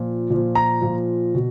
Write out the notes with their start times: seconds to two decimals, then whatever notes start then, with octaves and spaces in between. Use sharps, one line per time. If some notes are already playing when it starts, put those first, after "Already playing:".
Already playing: A#2 F3
0.30 A#2 F3
0.55 A#5
0.81 A#2 F3
1.35 B2